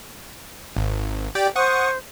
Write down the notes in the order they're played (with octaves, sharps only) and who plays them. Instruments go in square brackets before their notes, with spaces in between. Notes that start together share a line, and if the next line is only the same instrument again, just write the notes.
[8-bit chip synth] G#1
G4 D5 G5
[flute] C5 [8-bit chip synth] F#5 C#6 D#6